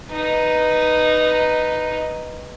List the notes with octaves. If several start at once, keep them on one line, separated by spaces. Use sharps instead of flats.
D#4 B4